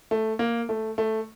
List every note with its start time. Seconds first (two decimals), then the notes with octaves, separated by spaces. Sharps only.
0.11 A3
0.39 A#3
0.69 A3
0.98 A3